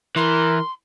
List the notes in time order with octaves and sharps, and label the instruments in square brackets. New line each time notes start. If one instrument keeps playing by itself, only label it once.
[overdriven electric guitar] E3 [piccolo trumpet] A#4 [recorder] C6